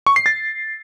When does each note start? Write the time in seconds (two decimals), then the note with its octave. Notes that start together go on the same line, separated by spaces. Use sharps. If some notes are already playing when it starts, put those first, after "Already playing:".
0.07 C#6
0.16 C7
0.26 A6